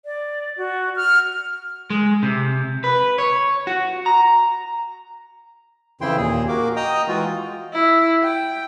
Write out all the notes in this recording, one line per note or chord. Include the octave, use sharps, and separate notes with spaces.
D5
F#4
F6
G#3
C3
B4
C#5
F#4
A#5
F2 C#3 E3 E4 G5 C6
D#2 A#2 G#4
A#3 F#4 A#4 D6
D#5 G5 A#5 D#6
E3 G#3 F4 F#4
E4
G5